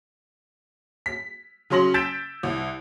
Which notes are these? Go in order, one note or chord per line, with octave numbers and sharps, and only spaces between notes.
B6
C#3 F#3 C#4 C6 A#6 F#7
E6 G6 A6 B6 D7 E7
C2